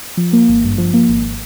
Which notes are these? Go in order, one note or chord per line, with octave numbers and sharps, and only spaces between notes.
F3
A#3
G#1
G2
F3
A#3
G#1